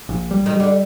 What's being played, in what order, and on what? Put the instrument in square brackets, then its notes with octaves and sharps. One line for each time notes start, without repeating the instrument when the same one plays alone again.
[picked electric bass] A#1
G3
[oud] D#3
[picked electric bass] G3
[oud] D3